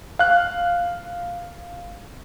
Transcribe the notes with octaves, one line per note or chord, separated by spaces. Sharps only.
F5 F#6